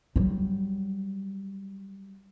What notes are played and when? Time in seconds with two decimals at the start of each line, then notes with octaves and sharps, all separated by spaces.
0.16 F#3 G3